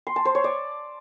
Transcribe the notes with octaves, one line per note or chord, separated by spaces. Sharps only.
C6
A5
C5
C#5
D5